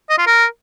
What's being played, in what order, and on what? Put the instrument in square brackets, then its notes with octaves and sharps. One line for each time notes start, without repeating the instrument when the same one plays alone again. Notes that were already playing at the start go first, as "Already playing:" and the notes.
[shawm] D#5
F4
A#4